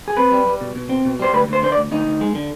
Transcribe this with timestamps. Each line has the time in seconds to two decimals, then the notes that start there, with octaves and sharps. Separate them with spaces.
0.08 G#4
0.17 C4 B4
0.31 G3
0.47 G3
0.61 B2
0.75 B2
0.89 C4
1.05 B2
1.20 G3 C5
1.33 D2 B4
1.48 D2 C5
1.63 D3 C5
1.72 D5
1.77 D2
1.91 D2 D#4
2.06 D2
2.21 G#3
2.35 D3